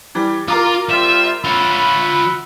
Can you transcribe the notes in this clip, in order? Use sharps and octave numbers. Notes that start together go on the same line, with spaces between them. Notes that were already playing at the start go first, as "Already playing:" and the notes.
E3 G3
F4 A#4 A#5 D6
G3 C4 F4 E5
F4 C#5 E5 F#5 B5